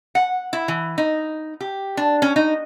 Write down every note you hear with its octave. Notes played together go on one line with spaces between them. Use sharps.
F#5
E4
E3
D#4
G4
D4
C#4
D#4